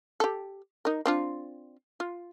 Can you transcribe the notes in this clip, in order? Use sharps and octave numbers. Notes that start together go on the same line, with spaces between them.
G4 A4
D#4 A#4
C4 D4 F4
F4